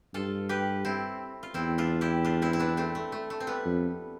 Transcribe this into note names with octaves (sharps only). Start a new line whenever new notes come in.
G2 F4 A4
G4 B4
C4 E4
F4
E2 C4 E4
D4 F4
E4 G4
D4 F4
C4 E4
E4
B3 D4
A3 C4
A3
A3
A3
C4
G3 B3
F2